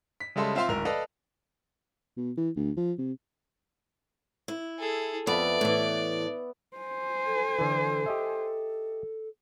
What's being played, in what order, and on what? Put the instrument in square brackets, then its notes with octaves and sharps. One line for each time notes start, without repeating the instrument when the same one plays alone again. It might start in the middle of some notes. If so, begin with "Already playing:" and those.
[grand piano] B6
C#3 G3 G#3 A4 E5 C6
C4 F4 C5 E5 F5 C6
D1 G#1 A#4 E6 F7
A4 B4 D5 D#5 F5
[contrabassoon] B2
E3
D2
F3
C3
[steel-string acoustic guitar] E4
[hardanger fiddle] G#4 A4
[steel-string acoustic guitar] F2 [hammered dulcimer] B3 E5 [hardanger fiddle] D5
[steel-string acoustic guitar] A2 E3
[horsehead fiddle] C5 G#5
[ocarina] A4
[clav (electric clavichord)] D3 E3
G4 D#5 E5